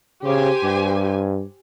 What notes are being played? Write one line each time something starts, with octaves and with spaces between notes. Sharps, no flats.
C#3 G4 C5 G#5
G2